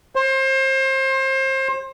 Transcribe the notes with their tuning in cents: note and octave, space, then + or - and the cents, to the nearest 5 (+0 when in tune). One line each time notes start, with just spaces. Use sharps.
C5 +30